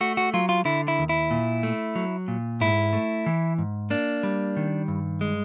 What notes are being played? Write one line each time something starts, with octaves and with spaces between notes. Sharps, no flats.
A3 F#4
F#4
F#3 F4
F4
D3 E4
E4
D#2
E4
A#2
A3
F#3
A#2
G#2 E4
A3
E3
G#2
A#3 D4
G3
D#3
G2
G#3